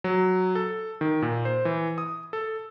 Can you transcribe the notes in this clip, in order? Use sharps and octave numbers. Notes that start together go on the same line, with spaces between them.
F#3
A4
D#3
A#2
C5
E3
D#6
A4